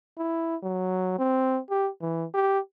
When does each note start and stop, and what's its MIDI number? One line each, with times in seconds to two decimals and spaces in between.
0.18 0.56 64
0.63 1.17 54
1.19 1.60 60
1.70 1.89 67
2.01 2.25 52
2.34 2.59 67